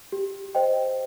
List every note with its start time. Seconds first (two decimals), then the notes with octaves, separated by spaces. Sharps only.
0.12 G4
0.55 C5 D#5 G5